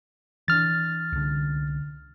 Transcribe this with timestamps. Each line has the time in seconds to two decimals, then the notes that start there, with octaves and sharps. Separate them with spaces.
0.48 E3 D4 F6 A6
1.12 C2 D3